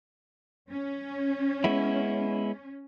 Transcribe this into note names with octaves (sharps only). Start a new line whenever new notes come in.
C#4
G#3 B3 E4